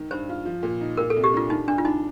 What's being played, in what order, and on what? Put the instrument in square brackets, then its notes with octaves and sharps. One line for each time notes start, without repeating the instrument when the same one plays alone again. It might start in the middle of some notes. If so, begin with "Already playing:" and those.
Already playing: [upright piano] D#3
[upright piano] G2 [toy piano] C5
[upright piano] F4
F3
A#2
D#4
[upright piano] A#2 [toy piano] A#4
[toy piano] A4
[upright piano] C2
[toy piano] G4
[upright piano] D4 [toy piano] F4
[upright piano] D#3 [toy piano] D#4
[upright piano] G2 [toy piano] D4
[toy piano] F4
[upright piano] D4 [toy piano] D#4